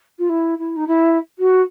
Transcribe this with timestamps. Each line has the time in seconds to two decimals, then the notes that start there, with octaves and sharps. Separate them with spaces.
0.18 F4
0.29 E4
0.58 E4
0.76 D#4
0.87 E4
1.38 F#4